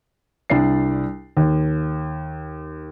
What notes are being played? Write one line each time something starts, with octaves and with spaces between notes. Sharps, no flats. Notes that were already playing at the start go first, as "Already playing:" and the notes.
C2 D4 D5 C7
D#2